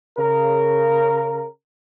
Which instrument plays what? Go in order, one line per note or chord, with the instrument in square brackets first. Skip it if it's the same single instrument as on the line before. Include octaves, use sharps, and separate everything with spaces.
[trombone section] C#3 A#4